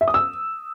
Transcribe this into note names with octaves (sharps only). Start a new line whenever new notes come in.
E5
D#6
E6